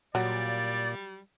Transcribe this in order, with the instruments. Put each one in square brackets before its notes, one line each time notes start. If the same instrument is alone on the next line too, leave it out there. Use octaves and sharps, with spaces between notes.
[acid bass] A#2 [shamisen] F#3 [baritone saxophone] G3 [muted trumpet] D5